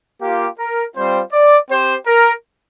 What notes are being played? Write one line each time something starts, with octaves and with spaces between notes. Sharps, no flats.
A#3 F4 G4
A#4
G3 C4 F4 C5
D5
C4 G4 C5
A#4